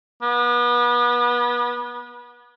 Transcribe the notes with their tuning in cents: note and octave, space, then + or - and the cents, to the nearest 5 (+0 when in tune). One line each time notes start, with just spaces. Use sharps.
B3 -35